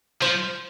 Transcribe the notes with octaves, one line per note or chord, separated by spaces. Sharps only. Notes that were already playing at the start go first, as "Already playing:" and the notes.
F3 C5